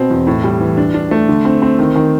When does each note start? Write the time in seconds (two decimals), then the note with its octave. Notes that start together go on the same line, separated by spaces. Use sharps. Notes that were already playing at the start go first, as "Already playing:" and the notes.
Already playing: B2 C4
0.10 E2
0.27 A2
0.44 G3
0.61 E3
0.77 D4
0.94 D4
1.11 A3
1.29 D3
1.45 C4
1.62 C4
1.79 D#3
1.96 D#3